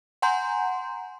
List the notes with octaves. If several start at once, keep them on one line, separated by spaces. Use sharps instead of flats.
F#5 G#5 A#5 C6 G6